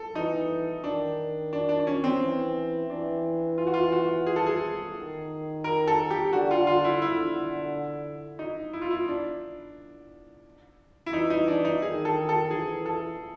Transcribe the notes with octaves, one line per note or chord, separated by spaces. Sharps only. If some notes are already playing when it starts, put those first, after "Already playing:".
Already playing: A4
E3 D#4
D#3 D4
D4
D4
D4
C#4
C4
E3
E3 D4
F4
F#4
F4
F#4
G#4
A4
G#4
D#3
A#4
A4
G4
D3 F#4
F4
F4
E4
D3 E4
D#4
E4
F4
E4
D4
E4
E3 D#4
D#4
D4
D#4
D#3 G#4
A4
A4
E3 G#4
A4